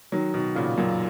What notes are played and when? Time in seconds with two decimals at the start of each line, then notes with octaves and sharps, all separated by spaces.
0.12 D#3 F#3
0.34 B2 D#3
0.55 A#2 C#3
0.77 F#2 A#2